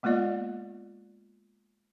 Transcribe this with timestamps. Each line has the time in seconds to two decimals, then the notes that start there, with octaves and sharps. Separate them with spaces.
0.03 G#3 A#3 B3 F4 D5 D#5